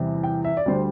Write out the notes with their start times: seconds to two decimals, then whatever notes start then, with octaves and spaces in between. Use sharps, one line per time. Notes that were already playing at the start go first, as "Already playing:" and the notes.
Already playing: E2 C3 E3 G3
0.23 G5
0.45 E5
0.57 D5
0.66 D2 D3 G3 C5